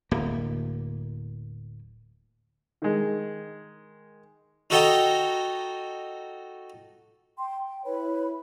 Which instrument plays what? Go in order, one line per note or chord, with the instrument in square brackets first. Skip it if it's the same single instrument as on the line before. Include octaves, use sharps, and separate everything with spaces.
[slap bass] D1 A#3
[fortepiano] D#3 G#3
[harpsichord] D#4 F#4 A4 D#5 G5 A#5
[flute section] G5 C6
G5
E4 B4 C#5 B5